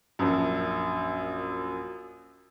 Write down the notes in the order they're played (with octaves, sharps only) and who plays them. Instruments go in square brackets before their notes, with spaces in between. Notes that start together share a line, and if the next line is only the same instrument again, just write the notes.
[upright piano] A#1 F#2